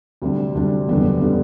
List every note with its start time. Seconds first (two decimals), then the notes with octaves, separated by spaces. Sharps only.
0.22 D2 C3 G3 D4
0.55 D2 C3 G3 D4
0.88 F#1 E2 D3 G3 B3
1.21 D3 G3 B3